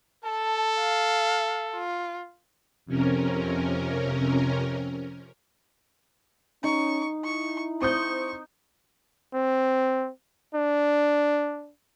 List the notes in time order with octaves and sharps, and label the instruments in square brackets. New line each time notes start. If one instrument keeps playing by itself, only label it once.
[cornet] A4 [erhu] A5
[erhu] F5
F4
[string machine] F2 C3 C#4 A#4
[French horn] C#4 [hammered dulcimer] D#4 [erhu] C#6
[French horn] E4 [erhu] C#6
[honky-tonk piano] C4 D#6 G6 [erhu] C#6
[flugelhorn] C4
D4